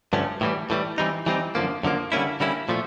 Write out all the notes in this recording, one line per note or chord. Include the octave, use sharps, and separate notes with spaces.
G2 D3 F3 A3 C#4
A2 E3 G3
A2 E3 G3
E3 G3 C4 D#4
E3 G3 C4 D#4
F#2 D3 F3 A#3
F#2 D3 F3 A#3
D3 G3 A#3 C#4 E4
D3 G3 A#3 C#4 E4
A#2 F3 A3